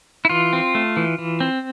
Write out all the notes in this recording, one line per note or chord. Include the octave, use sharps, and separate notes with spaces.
E4
E3 F4
C4
A3
E3
E3
C4